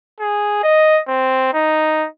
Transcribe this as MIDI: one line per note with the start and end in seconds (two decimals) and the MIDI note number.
0.20 0.62 68
0.63 1.00 75
1.08 1.51 60
1.53 2.07 63